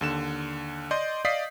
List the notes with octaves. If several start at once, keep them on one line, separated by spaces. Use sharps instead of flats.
D#2 D3 E7
D5 D#5 C6 G6
D5 D#5 F5 D#6 B6 C7